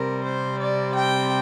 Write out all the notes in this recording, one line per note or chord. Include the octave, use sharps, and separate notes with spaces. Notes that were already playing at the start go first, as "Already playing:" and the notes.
Already playing: C3 G3 C4 A#4
C5
D5
G5